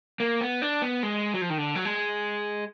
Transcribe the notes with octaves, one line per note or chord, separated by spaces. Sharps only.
A#3
B3
D4
B3
G#3
F#3
F3
D#3
D3
F#3
G#3